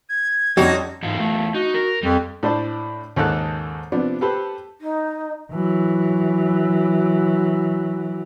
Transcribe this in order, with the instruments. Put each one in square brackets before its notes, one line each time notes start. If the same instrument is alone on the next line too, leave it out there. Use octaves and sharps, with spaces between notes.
[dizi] G#6
[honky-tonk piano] F2 [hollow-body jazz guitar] G3 C#4 [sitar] D#4 F#4
[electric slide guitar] E2 D#4 F4 [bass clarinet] G#2
[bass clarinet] A3
[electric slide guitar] D#4 [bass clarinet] F#4
[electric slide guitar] A#4
[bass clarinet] F2 [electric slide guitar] G3
[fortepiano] A2 D4 C5 D5 A5
D#2 G#2 C#3 D#4 A4 F#6
C3 F3 B3 D4
G4 A4 B4 C5
[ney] D#4
[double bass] E3 F#3